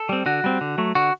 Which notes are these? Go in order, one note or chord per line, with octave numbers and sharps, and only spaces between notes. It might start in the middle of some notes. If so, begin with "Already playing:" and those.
Already playing: A4
G3 C4
D3 F#4
G3 C4
D3
F#3 A3
D3 F#4